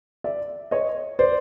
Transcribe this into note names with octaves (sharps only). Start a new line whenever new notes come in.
D5 E5
C#5 D#5
C5 D5